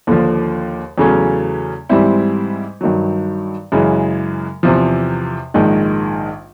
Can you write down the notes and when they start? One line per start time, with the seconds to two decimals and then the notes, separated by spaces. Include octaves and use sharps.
0.07 D#2 D3 F3
0.98 E2 C#3 F#3 A3 C#4
1.89 G#2 E3 G3 C4 E4
2.81 G2 D#3 F#3
3.72 F#2 C#3 E3 G#3
4.63 E2 C3 F3
5.54 A#1 G#2 D#3 G#3